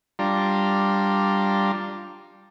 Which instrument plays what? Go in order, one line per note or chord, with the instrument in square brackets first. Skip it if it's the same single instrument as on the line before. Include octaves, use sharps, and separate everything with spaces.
[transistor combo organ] G3 D4 F4 A#5